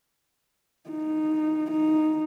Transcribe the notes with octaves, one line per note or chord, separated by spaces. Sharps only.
D#4
D#4